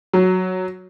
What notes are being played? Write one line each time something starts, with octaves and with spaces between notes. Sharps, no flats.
F#3